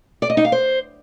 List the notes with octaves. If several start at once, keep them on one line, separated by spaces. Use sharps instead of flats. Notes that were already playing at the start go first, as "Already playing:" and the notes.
D5
D#5
D#4
F5
C5